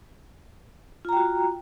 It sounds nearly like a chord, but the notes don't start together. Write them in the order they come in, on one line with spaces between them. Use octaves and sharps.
F4 A#5 G5 F#4